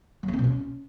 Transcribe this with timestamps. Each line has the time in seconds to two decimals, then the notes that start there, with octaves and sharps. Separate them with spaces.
0.23 F#3
0.28 B3
0.33 C4
0.39 B2
0.44 C#4